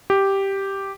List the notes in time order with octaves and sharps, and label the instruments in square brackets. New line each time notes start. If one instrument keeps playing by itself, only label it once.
[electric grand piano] G4